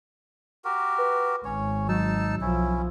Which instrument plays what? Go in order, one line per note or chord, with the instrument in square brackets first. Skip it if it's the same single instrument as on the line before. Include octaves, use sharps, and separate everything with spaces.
[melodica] F#4 G4 A#4
[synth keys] B4
[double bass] G#1 [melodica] C#4 C#5
[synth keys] F#3 [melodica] D#4 A5 E6
[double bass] B1 F3 [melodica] C#4 E4